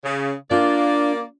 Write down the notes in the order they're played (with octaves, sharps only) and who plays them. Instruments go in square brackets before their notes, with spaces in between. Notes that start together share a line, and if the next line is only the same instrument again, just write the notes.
[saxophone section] C#3
[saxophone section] A#3 D5 [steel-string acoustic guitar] D4 F4